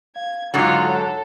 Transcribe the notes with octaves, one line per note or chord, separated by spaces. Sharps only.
F5 G#6
G#2 D3 F#3 F4 A#5 F#6 G#6 A6
A4 C#5 F#5